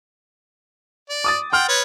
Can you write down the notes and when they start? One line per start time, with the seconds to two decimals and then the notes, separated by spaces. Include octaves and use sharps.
1.09 D5
1.24 D6 D#6 A6
1.53 F#5 G5 C6 F6
1.68 B4 C#5